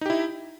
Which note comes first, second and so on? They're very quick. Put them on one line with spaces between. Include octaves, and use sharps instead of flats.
D#4 G4 E4